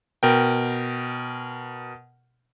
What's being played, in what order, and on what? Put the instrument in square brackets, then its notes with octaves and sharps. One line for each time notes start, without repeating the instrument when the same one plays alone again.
[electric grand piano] B2 A#4 G5